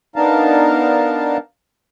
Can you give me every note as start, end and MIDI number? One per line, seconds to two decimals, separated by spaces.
0.16 1.37 59
0.16 1.37 62
0.16 1.37 63
0.16 1.37 70
0.16 1.37 77
0.16 1.37 81